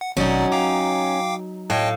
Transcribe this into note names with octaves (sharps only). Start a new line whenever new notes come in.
F#5
G#1 B2 F#3 C#4 D#4 D5
F5 G5 A#5 D6
A2 D#5 F5 G5 A5